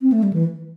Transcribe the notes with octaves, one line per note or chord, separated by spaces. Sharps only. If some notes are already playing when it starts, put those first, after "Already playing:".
C4
A3
G3
E3